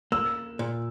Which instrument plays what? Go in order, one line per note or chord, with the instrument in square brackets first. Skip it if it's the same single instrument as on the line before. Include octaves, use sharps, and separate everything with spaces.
[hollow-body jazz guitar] A#3 [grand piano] E6
[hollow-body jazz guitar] A#2